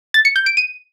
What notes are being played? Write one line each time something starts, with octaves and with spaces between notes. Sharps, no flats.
A6
C#7
G6
D7
D#7